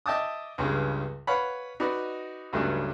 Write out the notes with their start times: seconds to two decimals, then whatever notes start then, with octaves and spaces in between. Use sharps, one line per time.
0.06 D#5 E5 G5 A5 D6 D#6
0.58 C#2 G2 C#3
1.27 B4 C#5 F5 F#5 B5
1.80 D#4 F#4 B4 D5 D#5
2.53 C#2 G2 F#3 A3 C#4 D4